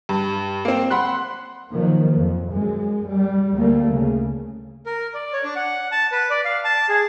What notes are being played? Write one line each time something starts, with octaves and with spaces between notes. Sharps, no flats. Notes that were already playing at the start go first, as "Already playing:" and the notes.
G2
A#3 C4
F#5 B5 C6 F#6
D#3 F3 F#3 A#3
F2
F#2 G#3
G3
D2 G3 A3 A#3
C#3
A#4
D5
C#5
D4
F#5
A5
B4
D5
F5
A5
G#4